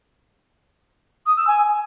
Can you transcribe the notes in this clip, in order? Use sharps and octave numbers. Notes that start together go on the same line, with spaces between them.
D#6
E6
G#5